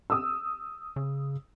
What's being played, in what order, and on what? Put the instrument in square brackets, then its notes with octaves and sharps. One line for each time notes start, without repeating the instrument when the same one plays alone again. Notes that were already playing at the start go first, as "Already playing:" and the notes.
[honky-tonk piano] D#6 E6
[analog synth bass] C#3